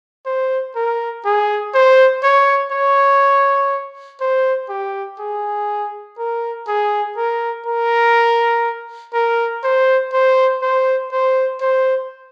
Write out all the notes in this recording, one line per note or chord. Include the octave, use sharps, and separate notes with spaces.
C5
A#4
G#4
C5
C#5
C#5
C5
G4
G#4
A#4
G#4
A#4
A#4
A#4
C5
C5
C5
C5
C5